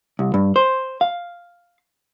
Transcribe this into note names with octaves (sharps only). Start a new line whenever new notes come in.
C2
G2
C5
F5